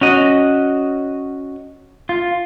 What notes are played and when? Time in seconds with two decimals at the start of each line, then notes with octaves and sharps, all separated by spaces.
0.01 C#4 F#4 D#5
2.09 F4